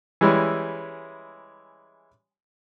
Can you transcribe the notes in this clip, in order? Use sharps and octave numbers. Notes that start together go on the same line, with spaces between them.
E3 G3 G#3 C#4 E4